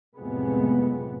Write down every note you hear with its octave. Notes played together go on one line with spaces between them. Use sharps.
F#1 F2 A2 C3 G#3 B3